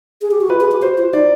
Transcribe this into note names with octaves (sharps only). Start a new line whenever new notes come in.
G#4
G4
F#4
F4 B4
G#4
G4
F#4 C5
F4
D#4 D5